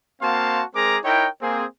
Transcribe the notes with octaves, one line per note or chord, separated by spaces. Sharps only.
A#3 C4 F#4 F5 A5 C6
G#3 C4 G#4 A#4 A#5 D6
D#4 E4 A#4 C#5 G5
A#3 C4 G#4